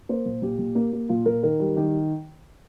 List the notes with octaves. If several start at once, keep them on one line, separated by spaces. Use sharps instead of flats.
A#3 C5
A#2
A#2 G4
A#2
A#3
A#3
A#2 F4
A#2 A#4
D#3 A#4
G3
D#3 G4